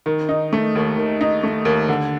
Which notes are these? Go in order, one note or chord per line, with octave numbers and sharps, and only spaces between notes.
D#3
D#4
A3
D#2
D#3
D#4
A3
D#2
D3